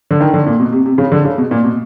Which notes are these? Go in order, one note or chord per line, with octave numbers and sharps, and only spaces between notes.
D3
D#3
D3
A#2
B2
C3
C3
C#3
D3
C#3
B2
A#2
B2